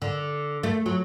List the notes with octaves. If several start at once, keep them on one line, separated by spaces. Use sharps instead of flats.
D3
A3
F#3